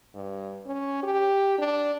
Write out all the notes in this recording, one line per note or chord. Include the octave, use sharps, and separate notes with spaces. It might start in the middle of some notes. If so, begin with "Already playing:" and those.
G2
C#4
G4
D4